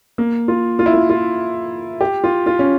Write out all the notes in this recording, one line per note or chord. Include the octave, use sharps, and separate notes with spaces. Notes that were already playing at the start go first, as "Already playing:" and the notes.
A#3
F4
F4
E4
F4
F4
G4
F4
F4
C#4